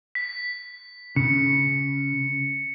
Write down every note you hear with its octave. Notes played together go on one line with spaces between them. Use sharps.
B6
C#3 C#7